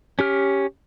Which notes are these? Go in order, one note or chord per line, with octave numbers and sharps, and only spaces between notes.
C#4 G4 F6